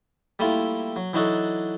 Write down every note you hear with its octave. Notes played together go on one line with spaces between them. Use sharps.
G3 A3 A#3 E4 F4
F#3
E3 F#3 D4 D#4 F#4 A4